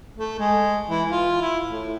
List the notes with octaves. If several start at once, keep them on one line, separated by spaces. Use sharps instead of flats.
A3
G#3
E3
F4
E4
A2